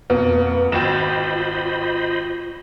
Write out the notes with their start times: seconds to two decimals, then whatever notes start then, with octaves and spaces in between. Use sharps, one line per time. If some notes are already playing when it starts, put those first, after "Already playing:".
0.10 F2 B2 A#3 B3
0.72 G#1 F4 F#4 C5 D#5 G5 B5 E7